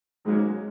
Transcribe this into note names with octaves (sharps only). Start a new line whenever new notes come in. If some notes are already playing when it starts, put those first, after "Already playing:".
G#1 G#2 F#3 G#3 A#3 C#4